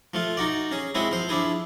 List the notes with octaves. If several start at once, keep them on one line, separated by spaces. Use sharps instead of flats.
F3 A3 F4
D#4 F#4 D5
C#4 G#4
G#3 C4 E4 F#4 G#4
F3 C5
F3 D4 E4 G#4